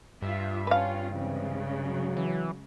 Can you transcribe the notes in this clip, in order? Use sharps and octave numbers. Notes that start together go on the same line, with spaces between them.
G2 F4 E5
C#4 F4 B4 F5
C#3 E3 G#3 C4
F#3
E3